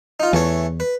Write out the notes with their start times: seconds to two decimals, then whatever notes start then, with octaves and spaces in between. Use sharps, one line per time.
0.20 D#4 F4
0.33 E2 E3 A3 C#5
0.80 B4